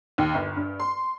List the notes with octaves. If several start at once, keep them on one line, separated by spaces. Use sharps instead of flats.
D#2
G1
G2
C6